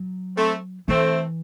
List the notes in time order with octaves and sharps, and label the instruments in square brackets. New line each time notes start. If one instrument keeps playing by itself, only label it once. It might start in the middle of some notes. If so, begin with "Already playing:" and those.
Already playing: [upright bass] F#3
[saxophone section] A3 C4
[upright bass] E3 [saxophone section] A3 C4